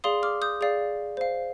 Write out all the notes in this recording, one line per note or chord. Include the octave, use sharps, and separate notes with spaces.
G#4 D5 F5 C6 D#6
D6 F6
D#6 G6
G#4 D5 F5
C5 F5